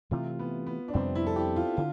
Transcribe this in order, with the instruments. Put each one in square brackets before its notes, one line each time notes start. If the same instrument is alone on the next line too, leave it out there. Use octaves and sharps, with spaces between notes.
[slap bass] C3 E3 A3 [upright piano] F4
[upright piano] B3
B3
D4
[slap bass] F2 C3 G3 [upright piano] C4
[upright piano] E4
A4
G4
F4
[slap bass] D3 [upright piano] F4